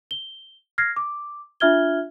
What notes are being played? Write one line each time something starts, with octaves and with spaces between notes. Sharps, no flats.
G7
F6 G#6 A#6 C7
D6
D4 F4 E5 F6 G#6 G7